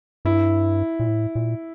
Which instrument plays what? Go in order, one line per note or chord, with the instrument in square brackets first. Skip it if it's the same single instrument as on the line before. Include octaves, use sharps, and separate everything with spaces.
[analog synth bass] G2 [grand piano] E4
[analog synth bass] A#2
A2
A#2